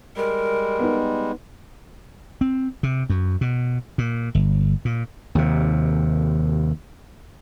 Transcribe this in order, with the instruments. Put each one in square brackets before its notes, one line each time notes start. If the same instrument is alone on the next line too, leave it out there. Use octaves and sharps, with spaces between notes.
[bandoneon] G3 G#3 [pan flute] A#4
[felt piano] B3 D#4
[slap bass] C4
C3
F#2
B2
A#2
G1
A#2
D#2 C3